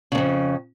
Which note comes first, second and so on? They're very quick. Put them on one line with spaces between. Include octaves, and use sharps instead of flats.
C#3 A2 F2